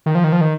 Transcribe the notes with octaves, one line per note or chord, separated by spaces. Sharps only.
D#3
F3
D#3
F3
D#3